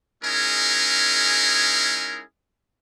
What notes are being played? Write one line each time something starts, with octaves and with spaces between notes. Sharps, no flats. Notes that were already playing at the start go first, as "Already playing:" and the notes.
G#3 C#4 D#4 E4 G#4 A#4